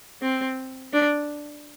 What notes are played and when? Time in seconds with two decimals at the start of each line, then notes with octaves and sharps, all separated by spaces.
0.22 C4
0.94 D4